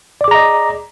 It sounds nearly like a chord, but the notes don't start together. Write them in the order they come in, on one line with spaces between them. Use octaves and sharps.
D5 D6 G#4 A#5 D#5